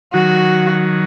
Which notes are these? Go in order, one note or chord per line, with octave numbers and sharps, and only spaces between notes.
D#3 F#3 F#4